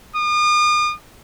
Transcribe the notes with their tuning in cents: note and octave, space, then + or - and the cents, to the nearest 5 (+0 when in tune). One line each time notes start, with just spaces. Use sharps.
D#6 -40